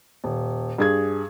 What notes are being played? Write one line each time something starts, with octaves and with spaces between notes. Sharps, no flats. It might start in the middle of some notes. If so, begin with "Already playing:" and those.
D#1
G2 G#4 G#6